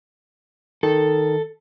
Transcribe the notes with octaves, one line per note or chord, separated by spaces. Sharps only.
D#3 A4